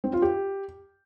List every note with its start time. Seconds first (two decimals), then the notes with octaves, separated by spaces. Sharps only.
0.04 C4
0.13 F4
0.22 G4